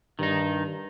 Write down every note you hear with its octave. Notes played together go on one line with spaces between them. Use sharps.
G2 D#3 D#4